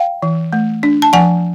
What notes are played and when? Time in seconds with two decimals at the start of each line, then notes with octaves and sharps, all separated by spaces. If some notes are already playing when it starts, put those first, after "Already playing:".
Already playing: F5 G5
0.22 E3
0.53 A3
0.83 D4
1.02 A5
1.13 F3 F#5 G#5